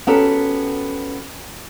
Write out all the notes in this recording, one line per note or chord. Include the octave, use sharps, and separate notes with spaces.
B3 C#4 F#4 G4 A4 A#4